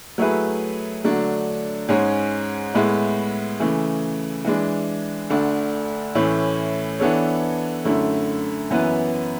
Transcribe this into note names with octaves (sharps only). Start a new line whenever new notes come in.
F#3 A3 E4 G#4 B4
D3 F#3 A3 D4
G#2 G#3 C#4 G#4 C#5
A2 G#3 B3 E4
C#3 E3 A3
E3 G#3 D4
D2 D3 A3 D4
A2 E3 A3 C#4 E4
E3 B3 D4 A4 C#5
F#2 D3 A3 E4
F#2 E3 B3 E4 B4